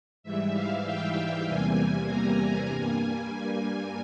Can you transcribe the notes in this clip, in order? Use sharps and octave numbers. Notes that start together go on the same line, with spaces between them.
G#2 E3 G3 E5
F5
G5
E2 C3 E3 G3 A#3 G#5
A#5
G2 G3 A#3 G#5